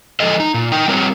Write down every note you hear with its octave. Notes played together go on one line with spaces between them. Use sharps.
D3 F3 G#3 A4 D#5
D#4
A#2
D#4 G5
G3 C4 A#4 C#5